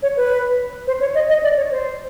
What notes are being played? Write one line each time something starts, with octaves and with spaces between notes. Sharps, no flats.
C#5
B4
C5
C#5
D#5
D#5
D5
C#5
C5